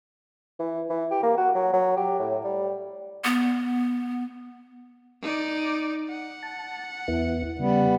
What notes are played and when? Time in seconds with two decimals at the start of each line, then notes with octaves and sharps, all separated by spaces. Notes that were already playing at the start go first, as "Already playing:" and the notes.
0.60 E3
0.90 E3
1.11 G4
1.23 A#3
1.37 F#4
1.55 F#3
1.73 F#3
1.97 G4
2.20 A2
2.44 G3
3.24 B3
5.22 D#4 D5
6.08 F#5
6.43 A5
7.08 E2 B3 E4
7.59 C#3 G3 B3